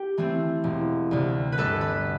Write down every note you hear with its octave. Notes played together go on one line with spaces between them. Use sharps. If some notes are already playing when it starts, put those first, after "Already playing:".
Already playing: G4
E3 A3 C4
E1
D2 C3
B4
G1 A4
B4